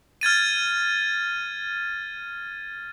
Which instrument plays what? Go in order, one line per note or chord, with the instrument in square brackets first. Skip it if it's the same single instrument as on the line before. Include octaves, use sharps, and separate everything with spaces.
[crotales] F6 G#6 A6 D#7